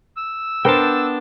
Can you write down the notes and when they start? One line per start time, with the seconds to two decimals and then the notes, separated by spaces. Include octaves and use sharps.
0.17 E6
0.65 B3 D4 A#4 C5 G5 A5